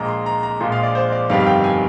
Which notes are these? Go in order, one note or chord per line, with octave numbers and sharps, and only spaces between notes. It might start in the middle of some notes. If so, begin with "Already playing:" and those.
Already playing: A#1 A#2 G#3 A#5
C6
A#5
A#5
A#1 A#2 F3 G#3 C6
F5
D5
C5
D5
G1 F2 D#3 G3 F5
F5
G5
G#5